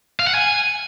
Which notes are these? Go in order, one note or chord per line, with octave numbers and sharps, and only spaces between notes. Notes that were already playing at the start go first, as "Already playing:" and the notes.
F5
F#5
G#5